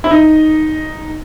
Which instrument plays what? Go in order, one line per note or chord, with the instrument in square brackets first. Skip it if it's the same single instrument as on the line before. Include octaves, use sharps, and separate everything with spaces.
[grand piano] E4
D#4